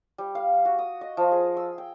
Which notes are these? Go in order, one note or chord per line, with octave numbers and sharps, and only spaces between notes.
G3
F5
F#4
D#6
D#5
F3
G#4
E6
G5